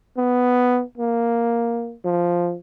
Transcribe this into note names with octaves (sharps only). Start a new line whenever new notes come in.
B3
A#3
F3